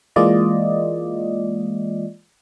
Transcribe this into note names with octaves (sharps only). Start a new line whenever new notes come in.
E3 G#3 A#3 F4 D5 D#5